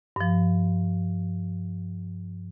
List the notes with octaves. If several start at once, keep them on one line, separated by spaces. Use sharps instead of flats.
G2 F3